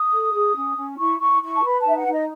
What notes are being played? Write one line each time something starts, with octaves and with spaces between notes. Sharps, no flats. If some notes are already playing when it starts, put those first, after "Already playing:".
Already playing: D#6
A4
G#4
C#4
C#4
E4 C#6
E4 C#6
E4 C#6
A5
B4 B5
A5
D#4 E5
F#5
D#4
D#5